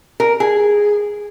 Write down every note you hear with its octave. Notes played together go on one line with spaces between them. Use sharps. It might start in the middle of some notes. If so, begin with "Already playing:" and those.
A#4
G#4